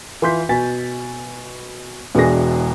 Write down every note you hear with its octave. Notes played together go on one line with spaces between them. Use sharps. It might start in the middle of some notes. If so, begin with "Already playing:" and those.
E3 F4 C6 G6 B6
B2 G#5 A6 B6
E1 B2 E3 D4 G#4 A#6